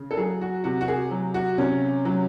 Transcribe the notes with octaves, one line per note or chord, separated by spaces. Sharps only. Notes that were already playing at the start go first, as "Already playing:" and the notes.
Already playing: C#3
A4
F#3 G#4
F#4
C3 F#4
F#4
G#4
F#3
F#4
C3 C#4
F#3